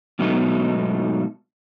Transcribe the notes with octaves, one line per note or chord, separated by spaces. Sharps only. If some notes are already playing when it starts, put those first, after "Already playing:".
G#2 B2 F#3 A3 B3 D#4